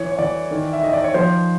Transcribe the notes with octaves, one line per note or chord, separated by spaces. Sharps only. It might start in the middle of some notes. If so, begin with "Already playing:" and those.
Already playing: E3 C#5
C#5
E3 D5
D#3
E5
D#3 D#5
D5
C#5
F3 C5